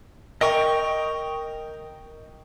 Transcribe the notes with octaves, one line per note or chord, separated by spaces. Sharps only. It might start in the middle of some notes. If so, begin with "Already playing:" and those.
A#4 D#5 G5 C#6